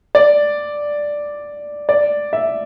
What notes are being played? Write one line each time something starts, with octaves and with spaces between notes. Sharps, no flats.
D5
D5
E5